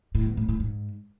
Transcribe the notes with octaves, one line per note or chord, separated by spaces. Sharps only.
A2
E2
A2
A2
G#2